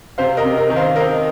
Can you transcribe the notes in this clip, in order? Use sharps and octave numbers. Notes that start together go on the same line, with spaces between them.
C3 C5 F5
A#4 D#5
C3
A#4 D#5
D#3
C5 F5
C4 A#4 D#5